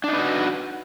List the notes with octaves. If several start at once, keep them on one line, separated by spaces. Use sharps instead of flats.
D4 D#4 F#4 B4